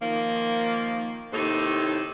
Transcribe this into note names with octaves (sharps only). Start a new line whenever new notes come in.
D#3 F3 A#3
D#2 A2 C3 D#4 A4 C5